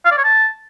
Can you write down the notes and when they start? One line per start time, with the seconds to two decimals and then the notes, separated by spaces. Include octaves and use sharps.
0.05 F5
0.11 D5
0.18 C#5
0.24 A5